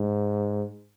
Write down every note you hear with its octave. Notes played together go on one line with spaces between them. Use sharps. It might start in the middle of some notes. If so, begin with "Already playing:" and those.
Already playing: G#2